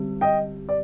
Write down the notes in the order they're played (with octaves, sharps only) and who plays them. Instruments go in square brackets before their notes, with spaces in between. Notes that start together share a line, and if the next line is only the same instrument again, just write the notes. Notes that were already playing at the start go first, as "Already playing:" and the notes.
Already playing: [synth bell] D3 G3 C4 G4
[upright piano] D#5 G5
D5